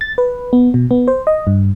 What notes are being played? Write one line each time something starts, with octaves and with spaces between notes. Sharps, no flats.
A6
B4
B3
B2
B3
C5
D#5
G2